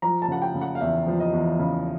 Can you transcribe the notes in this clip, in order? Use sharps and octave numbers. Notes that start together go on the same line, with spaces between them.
F3 A#5
A5
C#3 F#5
G5
C#3
F#5
F5
E2 E5
F3
D#5
E2
C#3